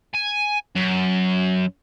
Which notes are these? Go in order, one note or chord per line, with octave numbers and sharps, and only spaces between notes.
G#5
F#2